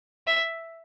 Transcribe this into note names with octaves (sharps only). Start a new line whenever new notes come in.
E5